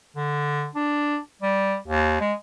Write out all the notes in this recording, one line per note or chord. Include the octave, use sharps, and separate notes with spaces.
D3
D4
G3
D#2
G#3